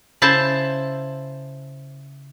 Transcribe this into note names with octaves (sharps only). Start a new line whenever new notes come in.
C#3 E4 C5 A5